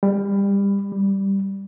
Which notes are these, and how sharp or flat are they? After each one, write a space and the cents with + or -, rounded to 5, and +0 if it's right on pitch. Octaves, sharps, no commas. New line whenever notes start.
G3 +25
G3 +0